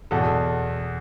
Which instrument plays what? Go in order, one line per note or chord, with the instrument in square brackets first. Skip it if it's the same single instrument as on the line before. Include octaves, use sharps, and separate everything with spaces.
[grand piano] E2 B2 A4